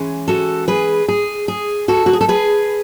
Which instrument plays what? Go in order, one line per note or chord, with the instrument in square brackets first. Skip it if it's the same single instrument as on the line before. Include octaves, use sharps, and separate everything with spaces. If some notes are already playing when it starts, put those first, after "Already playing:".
Already playing: [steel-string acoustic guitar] E3 G#3 C#4
F#4 A4
G#4 B4
G#4
G#4
F#4 A4
F#4
G#4
A4
G#4 B4